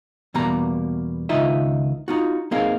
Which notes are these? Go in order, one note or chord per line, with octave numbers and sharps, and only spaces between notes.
E2 B2 G3 A#3 A#5
C#2 D#3 D#4 F4 D#5 E5
D#4 F4 F#4
A#3 C4 D#4 G#4 A#4 F5